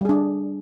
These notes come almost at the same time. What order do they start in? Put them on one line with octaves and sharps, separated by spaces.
G3 G#4 D4